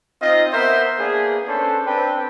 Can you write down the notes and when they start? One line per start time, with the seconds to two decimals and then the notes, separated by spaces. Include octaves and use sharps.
0.22 C4 D#4 F4 D#5
0.53 B3 A#4 C5 E5
0.98 A#3 B3 D4 G#4
1.47 C#4 D4 A4 B4 C5
1.86 C4 D4 B4 G5